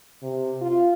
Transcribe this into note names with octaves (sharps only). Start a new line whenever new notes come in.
C3
F4